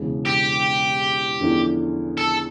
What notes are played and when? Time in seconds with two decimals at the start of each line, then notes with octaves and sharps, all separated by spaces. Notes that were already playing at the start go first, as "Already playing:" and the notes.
Already playing: E1 E2 C#3 E3
0.25 G4
1.41 E2 D3 F3 C#4 E4
2.18 A4